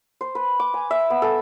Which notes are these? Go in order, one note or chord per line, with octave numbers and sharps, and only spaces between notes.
C5
B4
D6
G#5
E5
B3
A4